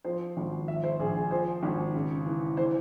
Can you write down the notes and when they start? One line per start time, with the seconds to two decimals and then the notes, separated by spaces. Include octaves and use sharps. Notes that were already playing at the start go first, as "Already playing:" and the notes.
0.04 F3 C5
0.37 G#1
0.68 F3 E5
0.84 C5
0.99 A#1 G#4
1.15 G#4
1.31 F3 C5
1.63 G#1
1.94 C#3
2.26 E3
2.57 E3 C5